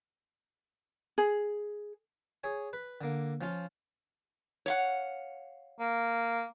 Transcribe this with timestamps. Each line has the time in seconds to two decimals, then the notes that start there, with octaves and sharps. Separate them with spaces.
1.18 G#4
2.44 G#4 C#5 G#5
2.73 B4
3.01 D3 A#3
3.41 F3 C#4 F4
4.66 C#5 F5 F#5
5.80 A#3